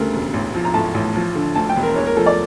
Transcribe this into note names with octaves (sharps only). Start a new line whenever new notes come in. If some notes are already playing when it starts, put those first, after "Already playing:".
Already playing: D2 C#3 G3 A4 A#4
E1
A1
F3
A#5
A2 A5
A1
F3
D3
D2 A5
G5
E1
A#4
E2 C#5
A#4
F3 A4
D5